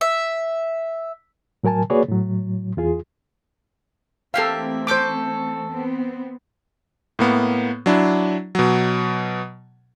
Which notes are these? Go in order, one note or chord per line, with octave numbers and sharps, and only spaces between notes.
E5
A2 F#3 A#4 G#5 A5
A#3 F#4 G#4 B4 C#5 D5
A2 F#3
E2 F4 G#4
E3 A3 A#3 C4 G4 A4 E5 F5
C#4 A4 C5 D6 G6
B3 C4
A2 A#3 B3
F#3 D4 E4
B2 F#3